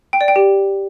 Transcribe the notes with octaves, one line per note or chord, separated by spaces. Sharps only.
G5
D5
G5
G4